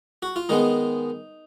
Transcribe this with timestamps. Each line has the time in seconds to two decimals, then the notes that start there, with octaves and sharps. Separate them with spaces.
0.23 F#4
0.36 F4
0.49 D#3 G#3 B3 D#4